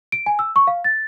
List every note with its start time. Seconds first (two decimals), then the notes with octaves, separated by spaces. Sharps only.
0.12 D7
0.26 G#5
0.39 E6
0.56 C#6
0.67 F5
0.84 A6